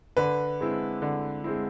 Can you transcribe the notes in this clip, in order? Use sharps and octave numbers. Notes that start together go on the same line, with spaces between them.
D3 B4
G#3 C4 E4
D3
G#3 C4 E4